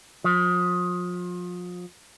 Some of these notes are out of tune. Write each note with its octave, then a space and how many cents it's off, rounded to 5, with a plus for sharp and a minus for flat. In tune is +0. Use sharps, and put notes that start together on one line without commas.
F3 +35